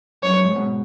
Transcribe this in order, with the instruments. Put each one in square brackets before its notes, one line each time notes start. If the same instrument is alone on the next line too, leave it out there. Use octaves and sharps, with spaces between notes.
[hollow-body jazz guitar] F#2 [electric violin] C#5
[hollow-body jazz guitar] F#2
G#2
G#2 B2